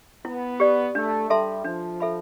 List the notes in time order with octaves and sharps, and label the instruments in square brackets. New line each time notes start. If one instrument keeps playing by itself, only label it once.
[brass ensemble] B3 [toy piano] E4
[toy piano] G4 D5
[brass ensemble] A3 [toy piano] D4
[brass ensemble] G3 [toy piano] A4 E5 A5 C6
[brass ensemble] F3 [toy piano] D4
[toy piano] A4 E5 B5